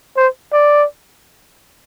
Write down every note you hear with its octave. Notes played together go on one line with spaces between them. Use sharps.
C5
D5